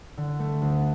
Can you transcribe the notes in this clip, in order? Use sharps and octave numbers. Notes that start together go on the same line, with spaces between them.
D3
A3
D2